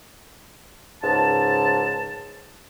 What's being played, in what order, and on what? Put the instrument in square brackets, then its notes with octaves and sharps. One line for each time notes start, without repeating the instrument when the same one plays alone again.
[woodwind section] C#2 G#2 A5